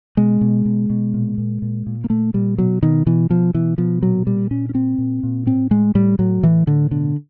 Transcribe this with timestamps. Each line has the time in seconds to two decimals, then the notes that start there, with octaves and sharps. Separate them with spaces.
0.17 B2 G#3
0.41 B2
0.66 B2
0.90 B2
1.14 A#2
1.38 A#2
1.62 A#2
1.86 A#2
2.04 A#3
2.10 A#2 A3
2.34 A#2 G3
2.58 B2 F#3
2.82 B2 D#3
3.06 B2 E3
3.30 B2 F3
3.54 B2 E3
3.78 B2 F3
4.02 A#2 F#3
4.27 A#2 G3
4.51 A#2 C#4
4.69 C#4
4.74 A#2 C4
4.98 A#2
5.23 A#2
5.46 A2 C4
5.71 A2 G#3
5.95 A2 G3
6.19 A2 F#3
6.43 A2 E3
6.67 A2 D3
6.91 B2 D3